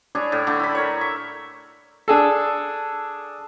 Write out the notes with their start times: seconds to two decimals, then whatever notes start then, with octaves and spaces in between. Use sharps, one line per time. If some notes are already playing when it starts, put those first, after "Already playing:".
0.15 D4 E4 G#4 C#5
0.32 A2
0.47 D3 A3
0.59 E4 B5
0.75 A#4 C#5
1.01 E5
2.08 D4 G#4 A4